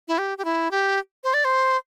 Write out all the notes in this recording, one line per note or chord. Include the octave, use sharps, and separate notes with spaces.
E4
G4
G4
E4
G4
C5
D5
C5